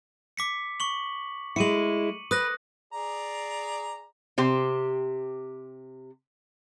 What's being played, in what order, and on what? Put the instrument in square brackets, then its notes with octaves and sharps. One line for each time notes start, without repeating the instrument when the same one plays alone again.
[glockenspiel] D6 B6 C#7
C#6 F#7
[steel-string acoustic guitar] G#3 E4 [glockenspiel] C#7 D#7 F#7
[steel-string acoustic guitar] B4 [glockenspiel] D#6 F#6 A#6
[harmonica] G#4 D5 A#5
[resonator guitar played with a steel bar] C3 G4 C5